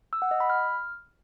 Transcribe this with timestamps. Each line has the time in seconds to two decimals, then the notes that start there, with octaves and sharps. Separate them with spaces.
0.13 E6
0.22 F#5
0.31 D#5
0.40 B5
0.50 F6